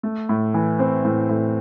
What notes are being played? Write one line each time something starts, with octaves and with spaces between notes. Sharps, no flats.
A3
A2
E3
C4
A2
A2